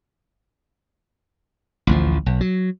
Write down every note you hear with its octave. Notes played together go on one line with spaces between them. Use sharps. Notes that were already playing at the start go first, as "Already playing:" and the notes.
A1 D2 F3
B1
F#3